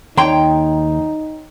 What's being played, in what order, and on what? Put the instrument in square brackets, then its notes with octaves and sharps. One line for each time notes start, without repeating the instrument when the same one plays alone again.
[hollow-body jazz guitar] D#2 A#5 C6 [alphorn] D#4 [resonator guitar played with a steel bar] C#5 G5